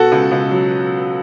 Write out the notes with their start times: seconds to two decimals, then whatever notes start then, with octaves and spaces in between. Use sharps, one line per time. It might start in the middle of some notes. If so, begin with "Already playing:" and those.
Already playing: B2 F#4 A4
0.12 C#2
0.31 C#2
0.51 F#3